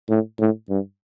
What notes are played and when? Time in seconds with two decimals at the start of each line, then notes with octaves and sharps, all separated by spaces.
0.09 A2
0.39 A2
0.69 G2